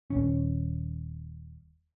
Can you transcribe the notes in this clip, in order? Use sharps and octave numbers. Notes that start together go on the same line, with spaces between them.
D#1 G#1 C#4